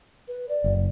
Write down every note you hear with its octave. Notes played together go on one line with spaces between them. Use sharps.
B4
D5
F#1